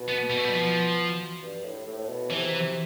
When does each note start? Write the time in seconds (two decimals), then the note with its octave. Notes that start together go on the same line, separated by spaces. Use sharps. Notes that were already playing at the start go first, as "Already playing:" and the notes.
Already playing: B2
0.08 B3
0.30 G3
0.37 A3
0.44 G3
0.53 F3
1.42 G2
1.64 A2
1.87 A2
1.98 A2
2.09 B2
2.31 C3 E3
2.54 C3